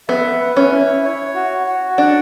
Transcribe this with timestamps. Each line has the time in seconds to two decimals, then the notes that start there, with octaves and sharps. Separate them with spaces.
0.09 B3 E5
0.40 B4
0.56 C#4
0.72 E4
1.04 C#5
1.35 F#4
1.66 F#4
1.98 D4 F#5